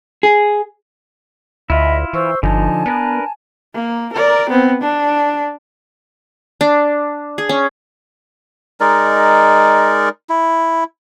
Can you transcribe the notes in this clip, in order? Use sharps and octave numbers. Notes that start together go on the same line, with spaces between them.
G#4
D2 E4 F4 D#5 E5 B5
E3 C5 C#6 E6
G1 D3 F3 D#4 G#5 A5
B3 D4 A#4 B4
A#3
A#4 D5
B3 C4
D4
D4
G#4
C#4
G#3 D#4 A#4 D5
E4